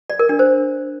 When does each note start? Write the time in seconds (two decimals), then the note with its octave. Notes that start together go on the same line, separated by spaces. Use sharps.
0.10 D5
0.19 A#4
0.29 D4
0.39 C5